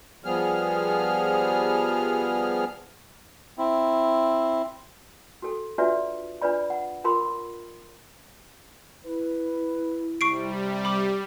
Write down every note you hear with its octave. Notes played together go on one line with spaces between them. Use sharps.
F3 G3 B3 G#4 F6
C4 E4
F#4 A4
D4 F4 F#4 B4 D5 E5
D4 F4 B4 D5 B5
F#5
F4 A#4 B5 C6
E4 B4
C3 G3 C#6 C7 D7
B5 D6